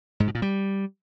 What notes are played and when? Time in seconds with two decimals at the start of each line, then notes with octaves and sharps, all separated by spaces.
0.20 G#2
0.27 B2
0.35 A#2
0.42 G3